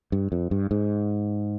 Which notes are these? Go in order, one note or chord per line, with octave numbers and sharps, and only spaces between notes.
G2
F2
G2
G#2